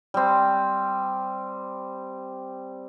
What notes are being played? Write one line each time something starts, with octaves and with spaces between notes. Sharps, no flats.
G3 C4